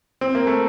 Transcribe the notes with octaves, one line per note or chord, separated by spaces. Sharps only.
C4
A#3
A3